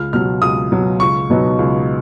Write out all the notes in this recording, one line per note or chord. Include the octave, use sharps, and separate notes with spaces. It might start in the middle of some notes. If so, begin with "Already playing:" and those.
Already playing: C#2 F6
B2 F#3 F6
C#2 D#6
B2 F#3
C#2 C#6
B2 F#3 B3 D#4
C#2